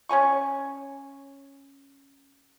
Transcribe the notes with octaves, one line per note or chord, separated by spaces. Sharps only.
C#4 C#5 G#5 C#6